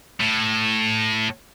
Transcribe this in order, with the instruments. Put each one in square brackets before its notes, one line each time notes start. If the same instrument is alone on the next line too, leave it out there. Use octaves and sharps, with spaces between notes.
[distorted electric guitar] A2